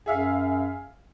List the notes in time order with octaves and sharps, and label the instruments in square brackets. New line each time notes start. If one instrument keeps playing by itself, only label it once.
[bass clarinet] F#2 [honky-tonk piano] G#4 E5 F5